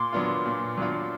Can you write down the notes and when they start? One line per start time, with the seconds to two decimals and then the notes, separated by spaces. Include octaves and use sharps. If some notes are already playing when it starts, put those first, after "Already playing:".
Already playing: A#2 C6 D6
0.13 F#3 B3 D4 F4
0.46 A#2
0.77 F#3 B3 D4 F4